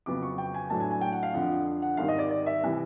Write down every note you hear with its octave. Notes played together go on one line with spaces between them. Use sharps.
F2 C#3 F#3 B3 D6
C#6
G5
G#5
A2 F#3 A3 D4 A5
G#5
G#5
G5
F#5
F5
F2 D3 F3 F#5
F#5
G#1 G#2 D#3 G3 F5
D#5
D5
D5
E5
C3 E3 G3